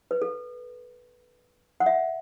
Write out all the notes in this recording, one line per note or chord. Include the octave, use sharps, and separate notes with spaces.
B4
A4
F#5
E5